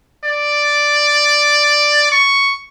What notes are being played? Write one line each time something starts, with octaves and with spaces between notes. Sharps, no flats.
D5
C#6